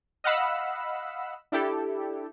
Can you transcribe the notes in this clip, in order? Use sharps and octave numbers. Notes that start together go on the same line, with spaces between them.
D#5 F5 F#5 B5 E6
D4 E4 G4 A4